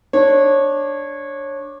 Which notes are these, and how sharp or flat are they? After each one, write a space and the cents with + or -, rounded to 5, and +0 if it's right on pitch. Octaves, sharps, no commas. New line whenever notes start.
D4 +0 C#5 -20